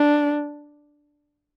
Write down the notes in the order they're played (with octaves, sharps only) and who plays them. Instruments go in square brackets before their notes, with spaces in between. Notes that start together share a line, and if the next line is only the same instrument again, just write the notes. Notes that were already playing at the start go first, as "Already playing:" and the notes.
Already playing: [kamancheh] D4